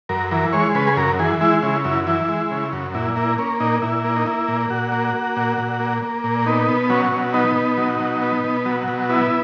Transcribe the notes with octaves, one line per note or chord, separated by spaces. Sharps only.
F#2 A#4
E3 A#4
G#3 C#5
C#3 B4
G#4
F#2 A#4
E3 G#4
G#3 E4
C#3 E4
F#2 E4
E3 E4
G#3
C#3
F#2
A#2 E4
A#3 E4
A#3 C#4
A#2 D#4
A#2 E4
A#3
D#4
A#3 E4
A#2
A#2 F#4
A#3
A#3
A#2
A#2
A#3
A#3
A#2
B3 D#4
B2
F#3 C#4
B2
B3 D#4
B2
F#3
B2
B3
B2
F#3
B2
B3 E4